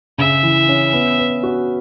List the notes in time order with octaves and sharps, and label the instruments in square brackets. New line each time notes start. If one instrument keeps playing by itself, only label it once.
[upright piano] C#3 [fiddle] E5
[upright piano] E3
C#4
B3
B4
F#4